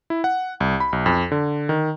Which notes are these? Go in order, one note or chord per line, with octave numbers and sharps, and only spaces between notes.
E4
F#5
C2
B5
B1
F2
D3
D#3